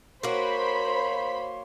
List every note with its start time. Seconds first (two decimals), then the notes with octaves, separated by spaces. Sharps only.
0.23 A#3 F#4 C5 C#5 B5 C6